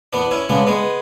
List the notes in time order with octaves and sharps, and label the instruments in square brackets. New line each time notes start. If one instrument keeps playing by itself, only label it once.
[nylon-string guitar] E2 [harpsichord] B3 D4
[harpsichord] C#4 E4
[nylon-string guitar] C#3 G#3 [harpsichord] B3 D4
[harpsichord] G#3 B3